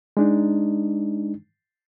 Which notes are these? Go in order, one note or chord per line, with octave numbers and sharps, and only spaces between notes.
G#3 D4 D#4